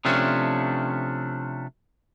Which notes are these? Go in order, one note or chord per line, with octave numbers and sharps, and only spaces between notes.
C3 F3 A3 C#4 D4